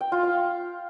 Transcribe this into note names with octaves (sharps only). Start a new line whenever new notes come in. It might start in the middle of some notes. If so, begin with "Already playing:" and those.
G5
F4
F5